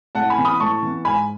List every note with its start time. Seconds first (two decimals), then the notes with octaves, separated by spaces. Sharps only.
0.15 A2 F#5 A5
0.30 G#5 B5
0.38 E3 B3
0.45 B5 D#6
0.60 A2 A5 C#6
0.83 E3 B3
1.05 G#2 G#5 B5